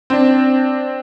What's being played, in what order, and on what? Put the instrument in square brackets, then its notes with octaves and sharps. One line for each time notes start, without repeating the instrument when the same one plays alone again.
[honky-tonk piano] C4 D4